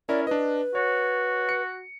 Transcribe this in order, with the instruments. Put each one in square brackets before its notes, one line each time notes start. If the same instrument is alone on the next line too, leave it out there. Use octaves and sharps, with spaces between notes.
[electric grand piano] C#4 E4 A#4 [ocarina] D5
[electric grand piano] D4 D#5 [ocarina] B4
[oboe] F#4 [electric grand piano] C#5
[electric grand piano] C#7